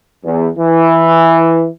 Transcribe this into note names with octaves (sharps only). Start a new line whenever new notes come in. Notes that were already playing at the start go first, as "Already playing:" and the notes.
E2
E3